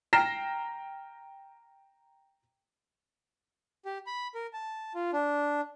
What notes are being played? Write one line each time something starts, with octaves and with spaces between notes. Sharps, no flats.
G5 A#5 F6 A#6 C7 E7
G4
B5
A#4
A5
F4
D4